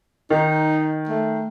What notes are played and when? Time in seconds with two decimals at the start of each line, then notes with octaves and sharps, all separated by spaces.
0.30 D#3 D#4
1.09 A3